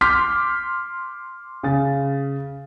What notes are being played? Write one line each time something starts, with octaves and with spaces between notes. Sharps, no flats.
C6 D6 F6 G6 B6
C#3 A6